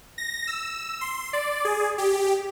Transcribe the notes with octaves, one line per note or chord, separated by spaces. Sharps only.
A#6
E6
C6
D5
G#4
G4